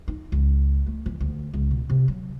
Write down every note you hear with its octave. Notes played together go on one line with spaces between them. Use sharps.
D#4
C#2
A3
E3
D2
C#2
B2
C3
F#3